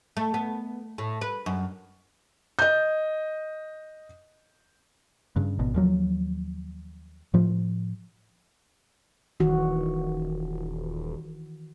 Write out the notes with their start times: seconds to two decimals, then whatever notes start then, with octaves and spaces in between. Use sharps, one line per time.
0.17 A3
0.34 B3
0.98 A2
1.21 B4
1.46 F#2
2.59 D#5 G6
5.36 G2 C#3
5.59 G#1 B2
5.74 D#2 F3 F#3
7.34 A2 F3
9.40 D#1 D#3 E3 F#4